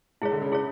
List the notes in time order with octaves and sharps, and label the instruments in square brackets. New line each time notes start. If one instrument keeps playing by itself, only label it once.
[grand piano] G#2 [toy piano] E4 G#4 C#5
[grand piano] D3
C#3
[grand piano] C#3 [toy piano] E4 G#4 C#5